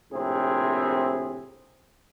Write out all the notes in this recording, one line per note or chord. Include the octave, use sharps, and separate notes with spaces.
A#1 A2 C3 C4 G#4